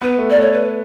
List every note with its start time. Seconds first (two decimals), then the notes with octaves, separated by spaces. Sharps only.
0.02 B3 B4
0.18 A3
0.30 D5
0.35 A3
0.40 C#5
0.52 B4